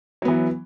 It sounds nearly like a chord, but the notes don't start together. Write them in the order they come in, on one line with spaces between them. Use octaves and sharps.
F#3 B3 E3